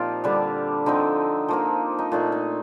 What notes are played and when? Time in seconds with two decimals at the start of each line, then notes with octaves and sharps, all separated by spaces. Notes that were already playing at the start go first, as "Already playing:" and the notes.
Already playing: A#2 F3 C4 D#4 F4 G4
0.24 D3 G3 D4
0.86 D3 F3 C4 D#4
1.48 F3 A#3 D#4
1.99 D#4
2.12 A#2 A3 D#4 F4
2.32 D#4